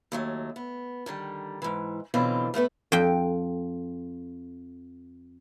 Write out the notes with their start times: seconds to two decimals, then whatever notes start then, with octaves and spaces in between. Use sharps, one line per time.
0.12 D#2 F#3 A3
0.56 B3
1.06 D3 D#3 G3
1.62 G#2 E3
2.14 B2 D3 E3 F#3 C4 F4
2.54 A2 A3 B3 B4
2.92 F2 G5